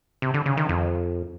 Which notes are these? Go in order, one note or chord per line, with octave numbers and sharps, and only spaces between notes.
C3
D3
C#3
D#3
F2